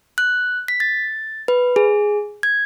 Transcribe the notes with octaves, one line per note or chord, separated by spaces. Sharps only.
F#6
B6
A6
B4
G#4
G#6